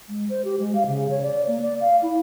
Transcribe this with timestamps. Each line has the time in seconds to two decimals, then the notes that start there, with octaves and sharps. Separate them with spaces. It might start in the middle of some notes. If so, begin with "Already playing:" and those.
0.09 G#3
0.29 C5
0.45 G4
0.59 G#3
0.75 F5
0.87 C#3
1.10 C#5
1.22 D5
1.48 A#3
1.62 D5
1.80 F5
2.02 E4